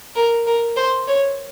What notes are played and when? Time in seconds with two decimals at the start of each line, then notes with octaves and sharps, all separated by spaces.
0.16 A#4
0.47 A#4
0.76 C5
1.08 C#5